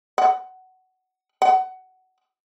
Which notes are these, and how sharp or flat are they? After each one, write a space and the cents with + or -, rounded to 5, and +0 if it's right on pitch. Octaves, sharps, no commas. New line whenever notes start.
F#5 +15
F#5 +15